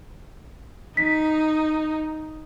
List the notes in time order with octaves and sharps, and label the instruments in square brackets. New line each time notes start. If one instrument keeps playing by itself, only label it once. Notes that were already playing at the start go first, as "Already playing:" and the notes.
[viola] D#4 [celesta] B6